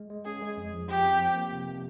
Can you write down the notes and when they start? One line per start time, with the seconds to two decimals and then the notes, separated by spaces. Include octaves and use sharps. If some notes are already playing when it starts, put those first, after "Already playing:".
Already playing: G#3
0.10 G#3
0.25 C#4 G#4
0.42 G#3
0.57 F2
0.73 F3
0.88 F3 G4
1.05 C4
1.21 F3
1.36 A#3
1.52 C3
1.68 C3